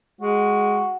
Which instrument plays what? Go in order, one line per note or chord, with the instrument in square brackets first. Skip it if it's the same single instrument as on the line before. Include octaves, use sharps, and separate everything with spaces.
[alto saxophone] G#3 [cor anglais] F#4